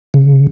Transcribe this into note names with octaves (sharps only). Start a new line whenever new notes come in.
C#3